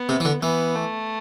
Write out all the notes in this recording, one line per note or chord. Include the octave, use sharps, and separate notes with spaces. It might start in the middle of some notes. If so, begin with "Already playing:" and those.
Already playing: B3
C3
E3
D3
E3 B3
A3